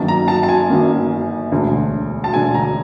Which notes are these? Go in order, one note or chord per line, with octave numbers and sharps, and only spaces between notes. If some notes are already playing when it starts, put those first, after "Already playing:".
Already playing: G1 F#2 D#3 F#3 A#3 A5
A#5
A5
A5
G#5
G1 F#2 D#3 F#3 A#3
E1 D2 D3
A5
E1 D2 D3 G#5
A#5